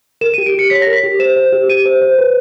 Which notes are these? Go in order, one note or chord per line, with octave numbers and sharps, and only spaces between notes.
A#4 E7
G4 D#7
D7
G4 C#7
C#5 B6
A#4 A#6
B6
G4
C5 E7
C5
G4
G4 D#7
C5
C5
B4